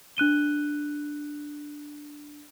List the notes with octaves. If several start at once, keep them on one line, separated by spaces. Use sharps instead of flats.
D4 F#6 D#7 G7